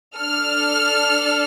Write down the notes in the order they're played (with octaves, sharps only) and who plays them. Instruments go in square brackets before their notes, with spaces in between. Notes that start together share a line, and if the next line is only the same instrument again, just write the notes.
[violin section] D4 A4 F6